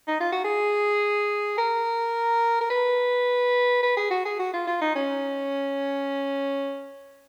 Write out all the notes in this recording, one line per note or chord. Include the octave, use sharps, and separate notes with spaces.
D#4
F4
F#4
G#4
A#4
A#4
B4
B4
G#4
F#4
G#4
F#4
F4
F4
D#4
C#4